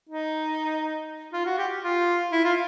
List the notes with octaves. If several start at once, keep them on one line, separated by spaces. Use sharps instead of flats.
D#4
F4
F#4
G4
F4
E4
F4